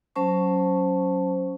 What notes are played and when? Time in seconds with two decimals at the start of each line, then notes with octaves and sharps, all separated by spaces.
0.16 F#3 C#4 C5 A5 C#6